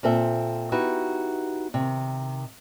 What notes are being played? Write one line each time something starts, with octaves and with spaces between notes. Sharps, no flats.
A#2 C4 A4 E5
B3 D#4 E4 F#4 G4
C3 D#3